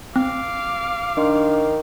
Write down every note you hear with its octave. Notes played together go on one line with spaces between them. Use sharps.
C4 F5 D6
D#3 D4 D#5 C6